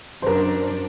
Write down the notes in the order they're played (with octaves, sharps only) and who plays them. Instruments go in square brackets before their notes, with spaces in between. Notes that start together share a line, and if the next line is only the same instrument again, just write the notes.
[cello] F#2 D4 [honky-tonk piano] A#4 C5